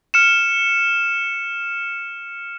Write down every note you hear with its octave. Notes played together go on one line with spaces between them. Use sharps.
F6 C#7 E7